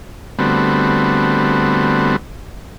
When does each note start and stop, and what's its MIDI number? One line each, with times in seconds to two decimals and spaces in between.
0.39 2.16 50
0.39 2.16 55
0.39 2.16 57
0.39 2.16 59
0.39 2.16 60
0.39 2.16 66